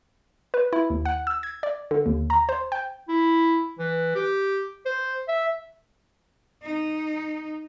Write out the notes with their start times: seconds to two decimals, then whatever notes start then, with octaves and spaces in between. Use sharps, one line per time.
0.54 B4
0.73 E4
0.90 D#2
1.05 F#5
1.27 E6
1.43 G#6
1.63 D5
1.91 D3
2.06 D#2
2.30 A#5
2.49 C5
2.72 G5
3.09 E4
3.79 E3
4.15 G4
4.86 C5
5.28 E5
6.63 D#4